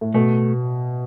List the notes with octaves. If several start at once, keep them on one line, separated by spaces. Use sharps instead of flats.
A2
B2 A3